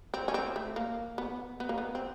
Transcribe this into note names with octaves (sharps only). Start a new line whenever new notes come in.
C4
C#4
C4
A3
A#3
B3
B3
A#3
B3
C4